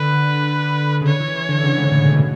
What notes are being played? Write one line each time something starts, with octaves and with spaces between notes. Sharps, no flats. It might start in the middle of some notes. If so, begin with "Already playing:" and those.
Already playing: D3 B4
C#3
D3 C#5
E3
E3
D3
C#3
G#2
A2
B2